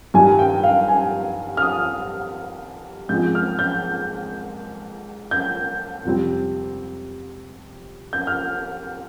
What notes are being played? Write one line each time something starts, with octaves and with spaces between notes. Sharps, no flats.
G2 D#3 G3 G#5
G5
F5
G#5
F6
D#6
G#2 F3 G#3 C4 G6
F6
G6
G6
F2 C3 G3 C4
G6
F6